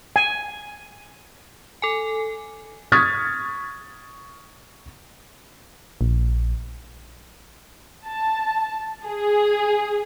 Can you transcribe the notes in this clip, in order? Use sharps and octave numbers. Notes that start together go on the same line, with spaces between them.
G#5
A4 G#5
C#6 D#6 F6 G#6 A6 B6
A#1
A5
G#4